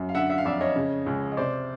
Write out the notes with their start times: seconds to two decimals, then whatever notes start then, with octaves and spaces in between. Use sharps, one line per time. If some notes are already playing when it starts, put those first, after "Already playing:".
Already playing: F#2
0.09 F5
0.15 D3 E5 F#5
0.30 E5 F#5
0.38 F5
0.45 F2 D5 E5
0.61 C#5 D#5
0.76 C#3
1.06 C#2
1.32 D#5
1.37 C3 C5 D5